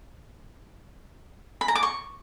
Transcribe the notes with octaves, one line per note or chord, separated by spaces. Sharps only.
B5
A#5
D6
C#6